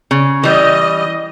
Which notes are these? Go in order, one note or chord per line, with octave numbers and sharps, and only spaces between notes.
C#3
E3 G3 D#5